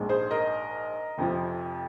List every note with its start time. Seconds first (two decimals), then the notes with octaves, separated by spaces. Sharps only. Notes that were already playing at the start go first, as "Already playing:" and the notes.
Already playing: A#1 G#2 G#3
0.09 G#4 C5
0.31 A#4 D#5
1.18 F1 F2 C3 F3